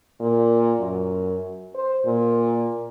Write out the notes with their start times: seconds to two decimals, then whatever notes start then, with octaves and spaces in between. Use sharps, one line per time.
0.20 A#2
0.80 F#2
1.74 C5
2.05 A#2